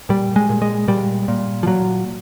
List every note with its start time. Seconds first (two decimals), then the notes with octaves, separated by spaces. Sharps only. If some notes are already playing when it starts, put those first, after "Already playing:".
0.09 A#2 G3
0.36 G#3
0.50 A#2
0.62 G#3
0.88 A#2 G3
1.28 A#2
1.63 F3
1.66 A#2 F#3